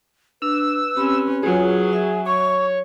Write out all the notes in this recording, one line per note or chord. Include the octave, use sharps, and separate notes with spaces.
D4 B4 E6
C4 C#4 G4 B5
F#3 F4 G#4 C#5
E5
C#5 C#6